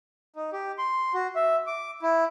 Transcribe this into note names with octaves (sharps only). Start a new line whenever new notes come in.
D#4
G4
C6
F#4
E5
D6
E4